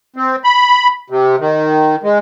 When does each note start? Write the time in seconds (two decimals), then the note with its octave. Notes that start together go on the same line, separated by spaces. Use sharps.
0.16 C4
0.44 B5
1.10 C3
1.40 D#3
2.03 G#3